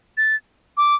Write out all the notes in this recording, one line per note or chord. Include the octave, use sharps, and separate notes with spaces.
A6
D6